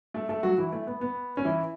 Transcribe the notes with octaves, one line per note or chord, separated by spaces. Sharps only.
A3 A4
A3 A4
F#3 F#4
E3 E4
A3
B3
B3
C#4
E3 E4